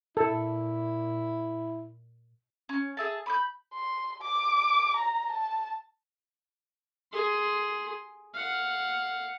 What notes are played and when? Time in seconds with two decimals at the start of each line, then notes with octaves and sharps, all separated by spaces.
0.17 A#2 E4 A4
2.69 C#4
2.97 G#4 E5 A5
3.26 B5 D#6 G6
3.73 C6
4.22 D6
4.96 A#5
5.32 A5
7.12 G#4 C6
8.34 F5 F#5